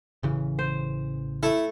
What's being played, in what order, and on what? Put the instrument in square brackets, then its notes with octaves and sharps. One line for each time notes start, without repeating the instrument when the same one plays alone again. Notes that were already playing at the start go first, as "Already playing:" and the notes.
[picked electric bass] A1 C#3 E3
[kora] C5
[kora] A3 A4 [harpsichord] E4